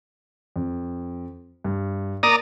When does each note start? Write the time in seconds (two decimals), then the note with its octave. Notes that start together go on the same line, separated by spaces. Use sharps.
0.56 F2
1.64 G2
2.23 A#3 D5 A#5 D#6 A6